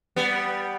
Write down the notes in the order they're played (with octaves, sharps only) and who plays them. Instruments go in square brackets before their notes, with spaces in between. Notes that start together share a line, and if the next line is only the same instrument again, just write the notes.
[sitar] G3 B3